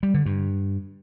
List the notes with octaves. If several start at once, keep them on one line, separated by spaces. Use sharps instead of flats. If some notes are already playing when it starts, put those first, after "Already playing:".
G3
D3
G2